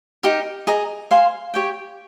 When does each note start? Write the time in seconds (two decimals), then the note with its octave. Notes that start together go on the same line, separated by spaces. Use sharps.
0.23 D#4 G4 A#4
0.67 G#4 D#5 A#5 D#6
1.11 C5 F5 G#5 C6
1.54 G4 C#5 G5